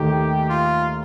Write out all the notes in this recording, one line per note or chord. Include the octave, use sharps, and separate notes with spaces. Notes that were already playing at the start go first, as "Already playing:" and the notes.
Already playing: D#2 D#3 A3 G4
F4